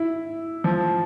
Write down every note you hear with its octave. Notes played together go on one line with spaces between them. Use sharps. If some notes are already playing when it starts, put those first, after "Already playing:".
Already playing: E4
F3